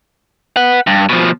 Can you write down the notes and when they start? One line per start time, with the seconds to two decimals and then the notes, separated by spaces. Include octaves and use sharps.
0.56 B4 F#5
0.87 G2
1.09 B2 F3